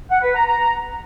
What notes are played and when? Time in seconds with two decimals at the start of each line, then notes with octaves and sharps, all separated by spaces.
0.11 F#5
0.23 B4
0.35 A#5
0.46 A#5